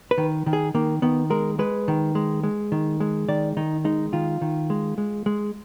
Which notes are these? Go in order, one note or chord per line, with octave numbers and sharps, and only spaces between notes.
B4
D#3
D#3
G#4
D#3 A#3
D#3 B3
G#3 A#4
G#3 B4
D#3
G#3
G#3
D#3
G#3
D#3 D5
D#3 D#4
G#3 D#4
D#3 F4
D#3
G#3
G#3
G#3